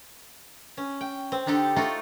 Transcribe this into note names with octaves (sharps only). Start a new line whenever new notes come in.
C#4
G5
C4
D3 D4 D#4 G4 A4
A3 D#4 F4 F#4 A4